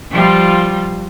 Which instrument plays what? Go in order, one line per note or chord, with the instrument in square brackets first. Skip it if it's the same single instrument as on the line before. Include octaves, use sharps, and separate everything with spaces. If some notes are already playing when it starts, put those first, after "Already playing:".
[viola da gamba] F3 G3 F4